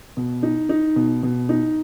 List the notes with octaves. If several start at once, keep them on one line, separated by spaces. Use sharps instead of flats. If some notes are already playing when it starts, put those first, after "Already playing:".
B2
D#4
D#4
B2
B2
D#4